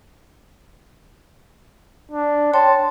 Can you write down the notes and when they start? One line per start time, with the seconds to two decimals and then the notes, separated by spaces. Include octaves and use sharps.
2.12 D4
2.54 C#5 G5 A5 C6